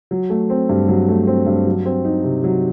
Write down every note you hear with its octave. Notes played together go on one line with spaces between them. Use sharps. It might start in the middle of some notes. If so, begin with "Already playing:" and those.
F#3
A3
C4
G2
F#3
A3
C4
G2
F#3
C4
D#4
C3
F#3